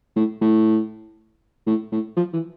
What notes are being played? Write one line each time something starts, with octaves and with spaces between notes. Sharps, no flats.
A2
A2
A2
A2
F3
E3